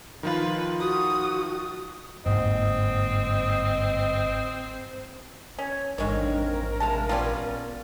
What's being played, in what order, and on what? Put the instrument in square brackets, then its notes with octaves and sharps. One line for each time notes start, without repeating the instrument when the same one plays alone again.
[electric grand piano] D#3 F3 F4 [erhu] B4
[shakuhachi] F#4 [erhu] D#6
[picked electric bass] G1 G#2 A#3 [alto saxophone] C4 [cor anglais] D#5
[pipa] C#4 [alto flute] C#5
[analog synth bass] A1 [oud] F2 G#2 D4 [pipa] G#3 C#5 [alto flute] A#4
[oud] C3 G#3 F5 [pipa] A5
[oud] A#2 B3 C#4 [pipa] F4 G4 D5